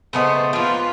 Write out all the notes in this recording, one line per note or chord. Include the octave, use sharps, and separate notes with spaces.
C#3 A3 B3 C5 D#5
F3 A#3 F4 B4